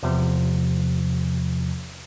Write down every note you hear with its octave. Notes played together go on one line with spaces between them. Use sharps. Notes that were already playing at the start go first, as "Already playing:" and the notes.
E2 C3 F3